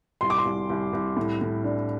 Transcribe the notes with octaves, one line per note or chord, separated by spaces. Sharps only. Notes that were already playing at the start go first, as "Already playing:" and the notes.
C2 C6
D6
C6
C2
C2
C2
A2
A2
D4